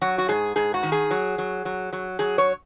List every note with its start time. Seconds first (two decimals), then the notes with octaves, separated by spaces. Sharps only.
0.02 F#3 F#4
0.18 F#4
0.28 G#2 G#4
0.56 G#2 G#4
0.74 F#4
0.83 D#3
0.92 G#4
1.11 F#3
1.38 F#3
1.65 F#3
1.93 F#3
2.19 F#3 G#4
2.38 C#5